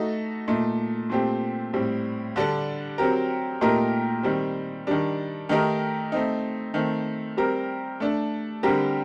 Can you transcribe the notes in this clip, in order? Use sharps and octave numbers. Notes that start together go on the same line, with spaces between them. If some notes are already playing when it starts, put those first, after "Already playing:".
Already playing: A3 D#4 F#4 A4
A#2 A3 D#4
A#2 A3 C4 G4
A2 G3 C4
D3 G3 D4 A4
F#3 C4 G4 A#4
A#2 A3 D#4 G4 A#4
D#3 G3 C4
D#3 G3 D4
D#3 A3 D#4 G4 A#4
A3 C4 D#4
D#3 A3 C4
G3 C4 G4 A#4
A3 D4 A4
D3 G3 C4 G4 A#4